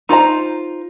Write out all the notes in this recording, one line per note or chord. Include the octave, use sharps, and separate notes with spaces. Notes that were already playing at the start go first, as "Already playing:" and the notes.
D#4 F4 C5 A#5